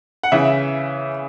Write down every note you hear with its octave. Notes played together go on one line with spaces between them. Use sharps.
F#5
C#3 E3 E5